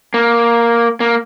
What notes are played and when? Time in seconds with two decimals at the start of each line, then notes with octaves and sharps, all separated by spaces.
0.14 A#3
1.00 A#3